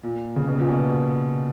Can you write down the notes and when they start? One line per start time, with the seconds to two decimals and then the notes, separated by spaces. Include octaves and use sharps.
0.03 A#2
0.36 C#3
0.47 B2
0.59 A#2
0.69 B2